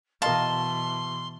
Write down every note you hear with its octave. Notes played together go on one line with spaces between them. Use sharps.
B2 E3 A#4 D#5 F5 A5 C6